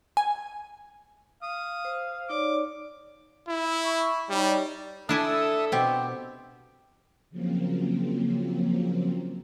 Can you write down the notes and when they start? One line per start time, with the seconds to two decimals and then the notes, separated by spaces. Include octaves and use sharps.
0.17 G#5
1.42 F5 D#6
1.85 C5
2.30 D#4 C#5 D5 D6
3.48 E4
3.84 B5 C#6
4.30 G3 D#4 C#5 D5
5.09 D4 E4 A4 E5 G#5 D#6 E6
5.72 B2 C4 G4
7.30 C#3 F3 F#3 A#3 C4